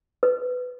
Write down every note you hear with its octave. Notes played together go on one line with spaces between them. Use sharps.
B4